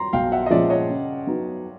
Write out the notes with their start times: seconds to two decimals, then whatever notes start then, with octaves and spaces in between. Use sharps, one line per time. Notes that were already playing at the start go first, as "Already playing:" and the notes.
Already playing: A#5 C6
0.13 B1 F5 G5
0.32 E5 F#5
0.46 D#5
0.50 A#2 F3 G#3 C#4 D5 E5
0.70 C#5 D#5
0.89 C#3
1.27 F#3 B3 D#4 F#4